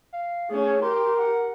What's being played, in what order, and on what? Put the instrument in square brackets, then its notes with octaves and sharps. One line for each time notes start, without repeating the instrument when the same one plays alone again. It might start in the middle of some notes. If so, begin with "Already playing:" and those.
[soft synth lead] F5
[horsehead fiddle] A3 C#4 [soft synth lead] G#4
[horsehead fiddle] G4 [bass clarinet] A#4 [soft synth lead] C6
[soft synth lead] F#5